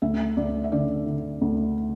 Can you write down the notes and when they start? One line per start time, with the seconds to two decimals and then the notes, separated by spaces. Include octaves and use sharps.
0.02 D2 E5
0.37 D2 D5
0.64 E5
0.72 D3 D5
1.06 D3
1.42 D2